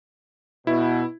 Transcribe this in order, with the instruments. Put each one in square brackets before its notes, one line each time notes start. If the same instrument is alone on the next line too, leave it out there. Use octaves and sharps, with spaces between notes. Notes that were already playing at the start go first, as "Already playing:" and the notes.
[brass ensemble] B2 [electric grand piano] E4